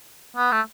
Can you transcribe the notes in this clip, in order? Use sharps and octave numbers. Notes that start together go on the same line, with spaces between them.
B3
A3